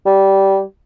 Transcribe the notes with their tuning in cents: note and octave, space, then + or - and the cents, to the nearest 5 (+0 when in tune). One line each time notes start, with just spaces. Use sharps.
G3 -15